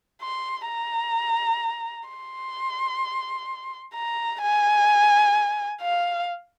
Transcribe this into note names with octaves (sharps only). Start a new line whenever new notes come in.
C6
A#5
C6
A#5
G#5
F5